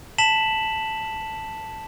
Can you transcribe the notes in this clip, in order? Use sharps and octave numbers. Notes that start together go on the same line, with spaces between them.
A5 B6 E7 F#7